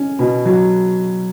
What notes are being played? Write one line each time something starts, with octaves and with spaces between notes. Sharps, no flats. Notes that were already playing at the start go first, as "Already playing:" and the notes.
Already playing: C#4
B2
F#3